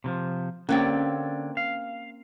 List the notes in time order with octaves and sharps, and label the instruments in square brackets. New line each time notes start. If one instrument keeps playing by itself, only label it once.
[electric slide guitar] C3 E3 F3
[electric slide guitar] D3 C#5 D5 [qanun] A#3 C4 G4 [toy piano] C#4
[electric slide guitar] F5